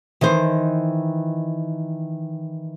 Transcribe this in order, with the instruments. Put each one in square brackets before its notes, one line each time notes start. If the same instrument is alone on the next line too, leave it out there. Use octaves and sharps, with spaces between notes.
[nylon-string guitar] D#3 E3 D#4 C5